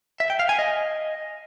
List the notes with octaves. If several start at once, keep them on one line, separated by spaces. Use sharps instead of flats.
E5
G5
F5
G#5
D#5